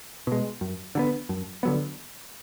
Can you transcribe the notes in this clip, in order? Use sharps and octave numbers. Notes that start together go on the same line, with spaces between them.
B2 G#3
F#2
D3 F#3 B3
F#2
D3 F#3 B3